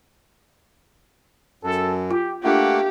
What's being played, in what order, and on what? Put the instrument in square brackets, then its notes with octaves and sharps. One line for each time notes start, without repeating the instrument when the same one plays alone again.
[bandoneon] F#2 [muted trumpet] A4
[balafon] F4 [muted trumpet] G4
[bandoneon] A3 A#3 [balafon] D4 F4 [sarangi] G4 [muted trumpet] F#5